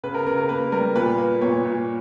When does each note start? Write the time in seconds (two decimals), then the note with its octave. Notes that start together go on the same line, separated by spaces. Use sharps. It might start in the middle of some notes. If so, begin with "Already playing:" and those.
0.03 C#3 B4
0.14 A#4
0.26 C#3 A#4
0.38 A#4
0.49 A#3 B4
0.72 G3 A#4
0.95 A#2 B4
1.18 A#3
1.41 A#2 C#5
1.65 A#2